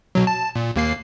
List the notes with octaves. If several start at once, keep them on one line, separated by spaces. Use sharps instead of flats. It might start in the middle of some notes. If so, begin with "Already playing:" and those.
B2 F#3
A5
A#2
D#2 A#3 C7